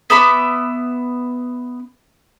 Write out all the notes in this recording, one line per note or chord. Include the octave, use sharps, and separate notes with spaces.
B3 E5 B5 D6